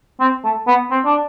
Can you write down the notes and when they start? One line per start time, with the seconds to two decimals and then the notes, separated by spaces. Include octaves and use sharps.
0.20 C4
0.45 A3
0.67 B3
0.91 C4
1.05 D4